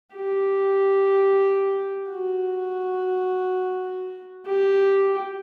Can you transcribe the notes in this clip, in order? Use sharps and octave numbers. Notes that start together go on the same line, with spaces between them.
G4
F#4
G4